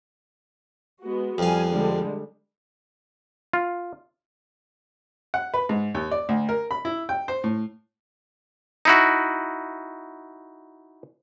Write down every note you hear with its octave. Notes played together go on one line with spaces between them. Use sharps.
G#3 B3 F#4
F2 G3 F5 G#5
D3 G3 G#3
F4
F#5
B4
G#2
D#2
D5
D2
A#4
B5
E4
G5
C5
A2
D#4 E4 F#4